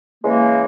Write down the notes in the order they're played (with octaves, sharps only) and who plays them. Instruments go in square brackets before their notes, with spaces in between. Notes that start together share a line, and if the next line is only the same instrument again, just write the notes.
[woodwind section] C#3 E3 G#3 A#3